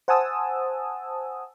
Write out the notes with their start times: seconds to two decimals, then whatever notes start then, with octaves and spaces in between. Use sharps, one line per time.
0.08 C5 F#5 G#5 A5 D#6 E6